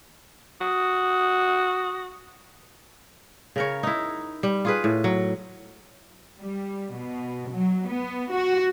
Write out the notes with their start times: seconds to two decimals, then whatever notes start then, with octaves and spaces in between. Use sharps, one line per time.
0.61 F#4 D#6
3.56 C#3 A#4 C#5
3.83 D#4 E4
4.43 G3
4.65 F4 G#4 B4
4.84 A2
5.04 F#3
6.39 G3
6.95 B2
7.52 F#3
7.88 B3
8.32 F#4